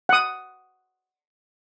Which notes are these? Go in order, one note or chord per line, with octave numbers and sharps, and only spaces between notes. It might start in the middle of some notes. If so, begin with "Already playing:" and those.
F#5 D#6